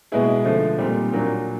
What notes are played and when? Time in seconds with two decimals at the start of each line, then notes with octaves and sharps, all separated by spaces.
0.12 B2 G#3 B3 E4 G#4
0.45 D3 F3 A3
0.78 A#2 G3 C4 D#4 G4
1.12 A#2 F#3 A#3 D4